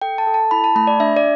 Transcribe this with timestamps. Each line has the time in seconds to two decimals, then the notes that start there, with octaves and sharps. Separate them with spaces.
0.02 A4 G5
0.18 A5
0.27 A4
0.34 A5
0.51 E4 B5
0.64 A5
0.75 A3 B5
0.87 D5
1.00 D4 E5
1.17 D5